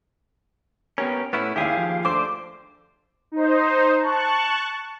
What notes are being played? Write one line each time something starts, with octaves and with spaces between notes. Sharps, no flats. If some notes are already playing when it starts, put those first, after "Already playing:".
B3 C#4 G4 A#4
A2 B3 C#4 E4
D#2 E4 G4 G#4 F5
F3
D2 D3 C5 D6
D#4 C5
A5 C#6 F#6